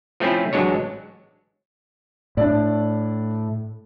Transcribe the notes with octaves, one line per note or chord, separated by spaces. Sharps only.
F3 A3 C4 C#4 E4
A1 F#3 G#3 D4 C#5
A2 D4 D5